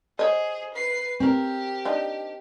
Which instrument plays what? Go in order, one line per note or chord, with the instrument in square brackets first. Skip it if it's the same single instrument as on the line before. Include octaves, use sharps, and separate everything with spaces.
[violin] G#4 C5 [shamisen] C#5 D#5
[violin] B4 C7
[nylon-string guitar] C4 A#4 [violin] G4
[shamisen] D4 D#4